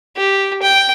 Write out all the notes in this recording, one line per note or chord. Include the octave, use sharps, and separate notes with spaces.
G4
G5